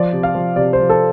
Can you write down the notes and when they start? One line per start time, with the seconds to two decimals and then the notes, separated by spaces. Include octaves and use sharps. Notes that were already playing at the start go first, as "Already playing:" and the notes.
Already playing: F3 D5
0.13 C3
0.23 F5
0.35 F3
0.56 C3 D5
0.73 C5
0.78 F3
0.89 A4